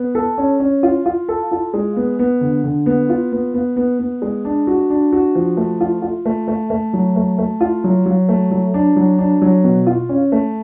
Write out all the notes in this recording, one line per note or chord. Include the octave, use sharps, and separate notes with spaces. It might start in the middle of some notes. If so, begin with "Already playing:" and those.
Already playing: B3
A4
C#4
C#4
F4
F4
A4
F4
G#3
B3
B3
D3
D3
B3
F4
B3
B3
B3
B3
G#3
D4
F#4
D4
F#4
F3
A3
F4
F4
A3
A3
A3
F#3
A3
A3
F4
F#3
F#3
A3
F#3
D4
F#3
D4
F#3
B2
F4
C#4
A3